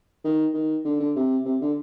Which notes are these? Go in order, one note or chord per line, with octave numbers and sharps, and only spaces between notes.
D#3
D#3
D3
D3
C3
C3
D3